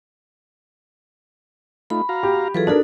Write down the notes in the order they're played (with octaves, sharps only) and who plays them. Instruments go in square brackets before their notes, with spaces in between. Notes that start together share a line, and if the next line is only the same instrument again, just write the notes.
[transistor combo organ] A3 D#4 F4 [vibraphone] B5
[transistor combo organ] F#4 F5 A#5
[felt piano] G4
[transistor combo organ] E3 F#3 F4 [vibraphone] G#4 A4 B4
[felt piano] D4 A#4 [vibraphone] D#4 F#4 A4